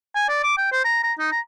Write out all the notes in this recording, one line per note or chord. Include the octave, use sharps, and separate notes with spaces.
G#5
D5
D6
G5
C5
A#5
A#5
D#4
A#5